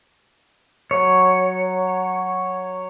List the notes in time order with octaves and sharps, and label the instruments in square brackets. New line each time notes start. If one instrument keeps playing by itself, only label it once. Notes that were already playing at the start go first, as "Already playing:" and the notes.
[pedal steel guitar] F#3 C#5